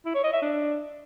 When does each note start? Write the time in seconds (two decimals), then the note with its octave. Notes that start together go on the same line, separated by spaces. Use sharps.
0.06 E4
0.15 C#5
0.24 D#5
0.33 E5
0.42 D4